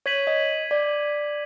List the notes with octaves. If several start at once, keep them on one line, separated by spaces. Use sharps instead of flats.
C#5 G#6 B6 D#7 F#7
D#5
D5